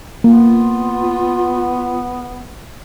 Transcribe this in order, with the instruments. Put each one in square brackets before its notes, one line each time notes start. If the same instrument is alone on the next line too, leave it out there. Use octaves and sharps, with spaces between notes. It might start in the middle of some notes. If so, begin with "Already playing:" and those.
[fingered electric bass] A#3 [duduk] B3 [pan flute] F4